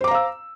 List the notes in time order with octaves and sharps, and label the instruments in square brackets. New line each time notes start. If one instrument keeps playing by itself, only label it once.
[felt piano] C5
D6
A#5
F5
E6